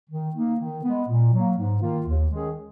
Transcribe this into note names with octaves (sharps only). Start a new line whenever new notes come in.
D#3
A#3 D#4
D#3
G#3 B3
A#2
F#3 A#3
G#2
D#3 A#3 F4
D#2
D#3 G#3 C#4 G#4